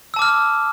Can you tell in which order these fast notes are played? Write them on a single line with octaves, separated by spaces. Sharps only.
E6 A5 D6 F6